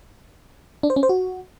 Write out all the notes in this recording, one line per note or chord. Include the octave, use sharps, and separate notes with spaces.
D4
C5
C#4
C5
F#4